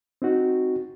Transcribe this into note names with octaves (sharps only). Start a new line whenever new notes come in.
C4 D#4 F#4